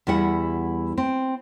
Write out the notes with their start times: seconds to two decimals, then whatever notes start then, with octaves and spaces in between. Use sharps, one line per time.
0.07 E2 G3 E4 F#5
0.98 C4